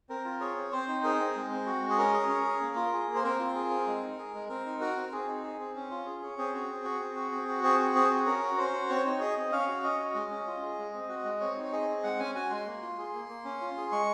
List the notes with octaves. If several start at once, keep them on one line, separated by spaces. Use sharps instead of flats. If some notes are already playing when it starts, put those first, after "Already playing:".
C4 A#4
F4
G#4 C#5
C4
C4 C5
D#4
G#4 A#4
C4
G#3
C4
F#4
G#3
G#4
C#4 A#4
G#4
C#4
G#4
A#3
F4
G#4
A#3
C5
C4 A#4
F4
G#4
C4
G#3
D#4
G#4
G#3
C4 A#4
D#4
F#4 A#4
C4
C4 G#4
D#4
G#4
C4
C#4
F4
G#4
C#4
C4 G#4
F#4
C4
F#4
C4
F#4
C4
F#4
C4 G#4
F#4
C4 G#4
F#4
C#4 A#4
F#4
C#4 C5
F#4
C4 C#5
D#4
G#4 D#5
C4
C#4 F5
F#4
C#4 D#5
F#4
G#3
C#4
F4
G#4
G#3
C4
F#4
G#3
C4 C#5
D#4
C#5
G#4 D#5
C4
G#3 F#5
C#4 G#5
F#4 G#5
G#3 C6
A#3
F4
G#4
A#3
A#3
C#4
F4
G#4
G#3 C#6